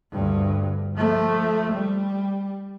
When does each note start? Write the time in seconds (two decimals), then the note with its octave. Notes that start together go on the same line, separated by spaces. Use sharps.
0.12 D2 G2
0.96 F3 A3
1.72 G3